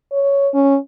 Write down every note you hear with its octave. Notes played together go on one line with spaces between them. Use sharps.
C#5
C#4